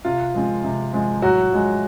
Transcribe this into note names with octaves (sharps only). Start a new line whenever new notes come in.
C3 F4
F3 G#3 C4
C3
F3 G#3 C4
A2 F#3 F#4
F3 G#3